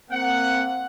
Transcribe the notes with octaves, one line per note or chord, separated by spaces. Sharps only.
A#3 C4 F#5